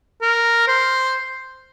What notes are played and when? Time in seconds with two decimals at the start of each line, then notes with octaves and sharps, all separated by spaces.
0.22 A#4
0.68 C5